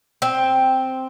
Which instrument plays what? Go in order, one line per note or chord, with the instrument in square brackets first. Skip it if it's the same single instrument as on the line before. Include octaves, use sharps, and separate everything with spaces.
[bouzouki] C4